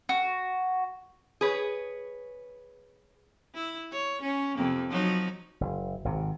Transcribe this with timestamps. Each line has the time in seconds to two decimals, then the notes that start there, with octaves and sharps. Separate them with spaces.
0.09 F#4
1.41 G#4 B4 C#5
3.54 E4
3.91 C#5
4.22 C#4
4.57 F2 C3 A#3
4.90 F3 F#3 D#4
5.61 F#1
6.05 G#1 C3